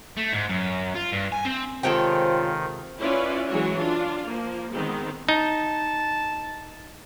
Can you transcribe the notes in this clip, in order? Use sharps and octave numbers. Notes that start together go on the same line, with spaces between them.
A3
G#2
F#2
F4
G2
G#5
C4
C3 D#3 G#3 F4 A4 C5 C#5 G5
C#4 E4 F4 B4 C#5 D5
E3 F#3 G#3 F#4 C#5
D4 F4
F3 A#3
D#3 G#3 B3 C4
D#4 A5